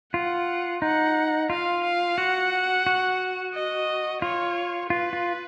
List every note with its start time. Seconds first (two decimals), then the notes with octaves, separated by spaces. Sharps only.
0.14 F4 F#5
0.82 D#4 F#5
1.50 F4 F5
1.84 F5
2.18 F#4 F#5
2.87 F#4
3.53 D#5
4.22 F4 C#5
4.90 F4 B4
5.13 F4